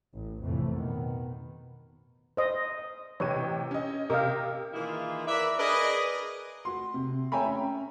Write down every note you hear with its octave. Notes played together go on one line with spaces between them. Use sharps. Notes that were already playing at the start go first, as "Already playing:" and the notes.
A1
F2 A2 C3 E3 A3
B2 D#3 B3
C5 D#5
A1 C3 C#5 D#7
C#4 D#5
C3 A#4 D#5 F5
D#3 E3 A#3 E4 F4 G#4
A#4 B4 D5 E5
G#4 A#4 B4 D5 D#5
F#4 C6
C3
C#5 E5 G5 G#5 A#5 B5
C#4